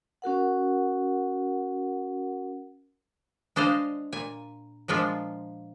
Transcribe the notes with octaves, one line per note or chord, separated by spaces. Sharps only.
C#4 F#4 A#4 F#5
G#3 D4 C5 D#5 F5
A#2 G#5
A#2 F3 G#3 D4 F4